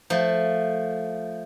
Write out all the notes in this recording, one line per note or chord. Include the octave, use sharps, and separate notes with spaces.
F3 A3